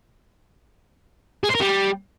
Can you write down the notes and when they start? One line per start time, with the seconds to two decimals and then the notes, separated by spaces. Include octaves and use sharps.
1.44 G#4
1.49 C5
1.55 A#4
1.60 G3